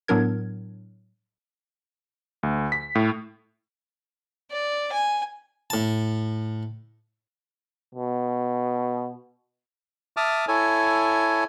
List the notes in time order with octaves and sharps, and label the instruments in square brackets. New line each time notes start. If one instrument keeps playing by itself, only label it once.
[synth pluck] A2 F#3 B3 D4 A#4 G#6
[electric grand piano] D2
B6
A2
[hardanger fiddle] D5
G#5
[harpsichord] A2 A5
[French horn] B2
[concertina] E5 A5 D6 D#6 F6
E4 A4 C#5 G#5